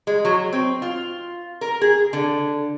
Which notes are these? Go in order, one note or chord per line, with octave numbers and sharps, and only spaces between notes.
G#3
F#3
C4
F4
A#4
G#4
D3